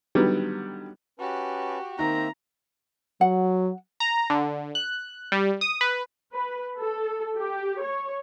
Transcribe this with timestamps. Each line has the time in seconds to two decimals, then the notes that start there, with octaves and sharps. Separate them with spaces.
0.15 D3 D#3 F#3 G3 B3 G4
1.19 C#4 F#4 G4 B4 A5
1.99 D#3 A#3 C4 E5 A#5
3.21 F#3 F#5
4.00 A#5
4.30 D3
4.75 F#6
5.32 G3
5.61 D#6
5.81 B4
6.32 B4
6.79 A4
7.36 G4
7.82 C#5